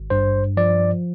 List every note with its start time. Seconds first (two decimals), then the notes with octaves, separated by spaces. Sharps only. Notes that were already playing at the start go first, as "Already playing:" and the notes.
Already playing: G#1
0.10 G2 C5
0.57 F3 D5